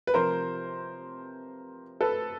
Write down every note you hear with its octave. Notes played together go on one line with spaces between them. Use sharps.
B4
C3 F3 A#4 C5
A4 B4